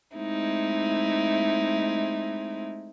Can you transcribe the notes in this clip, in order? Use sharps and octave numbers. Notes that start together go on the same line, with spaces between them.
G#3 A3 C4 D#4 E4